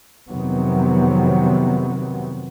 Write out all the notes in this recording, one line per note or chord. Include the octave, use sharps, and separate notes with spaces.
F2 C3 D#3 F#3 B3